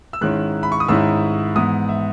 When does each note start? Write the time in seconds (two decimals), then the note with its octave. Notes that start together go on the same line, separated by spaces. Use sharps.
0.13 E6
0.21 G#2 D#3 G#3 C#4 E4 F#6
0.63 B5
0.72 C#6
0.80 D#6
0.88 G#2 D#3 G#3 C#4 E4 E6
1.56 G#2 E3 B3 D#6
1.89 E5